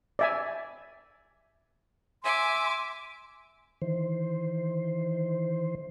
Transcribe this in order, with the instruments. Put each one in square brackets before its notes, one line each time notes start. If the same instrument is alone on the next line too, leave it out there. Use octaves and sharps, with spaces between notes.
[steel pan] D5 E5 G#5
[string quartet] E5 G#5 D6 [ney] C6
[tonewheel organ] D#3 E3 C5